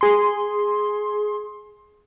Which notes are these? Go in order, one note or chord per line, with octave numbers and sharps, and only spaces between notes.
G#4 C6